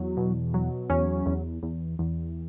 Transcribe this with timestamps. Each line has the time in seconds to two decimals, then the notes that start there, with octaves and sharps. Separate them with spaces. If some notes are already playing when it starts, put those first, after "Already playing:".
Already playing: E2 F#3
0.17 B2
0.54 F#3
0.90 E2 C#4
1.26 E2
1.63 E2
1.99 E2